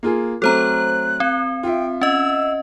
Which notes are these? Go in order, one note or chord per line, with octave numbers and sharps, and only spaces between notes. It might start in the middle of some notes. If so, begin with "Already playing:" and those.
A#3 F4 G#4
F#3 A3 C4 A4 C5 A#5 F#6
C4
F4 E5 G5
C#4 D#5 E6